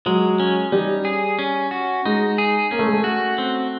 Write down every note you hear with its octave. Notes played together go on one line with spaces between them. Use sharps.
F#3 G#3
C#4
G3 D#4
G#4
C#4
F#4
G#3 D#4
G#4
A#3 C#4
A3
G#3
A3
F#4
C4